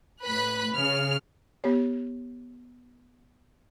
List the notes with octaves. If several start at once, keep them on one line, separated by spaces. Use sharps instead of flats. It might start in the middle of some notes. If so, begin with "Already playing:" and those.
A2 B4 B5 F#6
C#3 F6
B3 G4 C#5